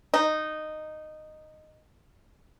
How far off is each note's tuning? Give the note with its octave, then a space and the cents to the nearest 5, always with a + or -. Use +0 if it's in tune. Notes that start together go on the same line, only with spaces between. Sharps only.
D#4 -10